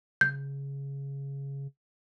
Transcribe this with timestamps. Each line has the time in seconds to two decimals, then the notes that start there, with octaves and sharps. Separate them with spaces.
0.21 C#3 G6